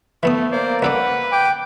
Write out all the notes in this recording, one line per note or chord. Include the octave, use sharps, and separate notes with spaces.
E3 A3 B3 D#6
A#3 C5 D5
C#2 A4 B4 D5 F#5
G5 D6